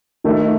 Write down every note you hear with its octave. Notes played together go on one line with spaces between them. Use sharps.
D#3 A3 D#4